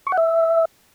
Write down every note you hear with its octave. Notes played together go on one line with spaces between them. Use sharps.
C#6
F#5
E5